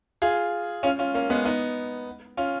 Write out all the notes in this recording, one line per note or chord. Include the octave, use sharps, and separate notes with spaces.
F4 G#4
C#4 F4
C#4 F4
A#3 C#4
G#3 B3
B3 D#4
C#4 F4